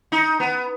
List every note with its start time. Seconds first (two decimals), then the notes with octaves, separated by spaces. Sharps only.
0.12 D#4
0.40 B3